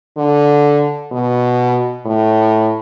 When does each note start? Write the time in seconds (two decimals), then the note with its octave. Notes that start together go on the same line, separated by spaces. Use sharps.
0.17 D3
1.12 B2
2.05 A2